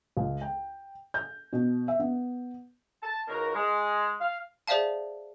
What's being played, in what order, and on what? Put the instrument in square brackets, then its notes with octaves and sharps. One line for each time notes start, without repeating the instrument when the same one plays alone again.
[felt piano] C#2
G5
G6
B2
E5
B3
[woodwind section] A5
C#2 D#4 F#4 A#4
G#3
F5
[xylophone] G#4 C5 D5 E5 F5 A5